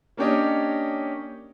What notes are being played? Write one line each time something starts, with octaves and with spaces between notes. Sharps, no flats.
A#3 C#4 D4 G4 C#5 D#5